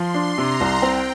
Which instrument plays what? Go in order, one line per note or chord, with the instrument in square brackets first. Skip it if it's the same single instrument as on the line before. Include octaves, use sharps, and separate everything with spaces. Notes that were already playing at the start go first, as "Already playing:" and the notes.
Already playing: [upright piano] F3 [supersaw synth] C6
[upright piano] D4
[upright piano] C3 [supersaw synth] A#5
[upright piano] C2
[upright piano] C4 [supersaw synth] G5